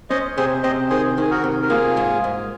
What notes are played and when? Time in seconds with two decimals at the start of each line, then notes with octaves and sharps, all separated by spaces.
0.10 C#4 C5 D#5
0.37 C3 G#4 C5
0.63 C3 C5 D#5
0.90 D#3 G#4 C5
1.18 D#3 G#4
1.31 F#4 A#4
1.44 C3
1.62 A#4
1.70 A#3 F4 G#4
1.97 G#2
2.24 G#2